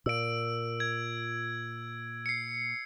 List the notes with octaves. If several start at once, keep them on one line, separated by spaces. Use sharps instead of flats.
A#2 E6 D7
G#6
C7 C#7